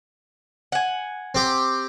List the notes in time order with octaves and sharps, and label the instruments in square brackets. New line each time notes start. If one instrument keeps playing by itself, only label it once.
[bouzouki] F#5 G#5
[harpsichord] C4 G4